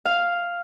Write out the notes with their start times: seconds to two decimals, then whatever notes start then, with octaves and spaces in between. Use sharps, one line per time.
0.05 F5